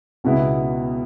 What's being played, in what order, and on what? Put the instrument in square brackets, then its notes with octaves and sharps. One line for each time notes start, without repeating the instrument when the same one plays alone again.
[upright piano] C#2 B2 G#3 B3 E4